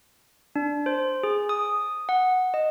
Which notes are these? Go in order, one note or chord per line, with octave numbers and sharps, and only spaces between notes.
D4
C5
G#4
D#6
F#5
D#5